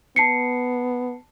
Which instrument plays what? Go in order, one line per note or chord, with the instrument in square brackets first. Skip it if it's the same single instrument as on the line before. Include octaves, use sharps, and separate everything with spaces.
[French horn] B3 [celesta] A5 C7 C#7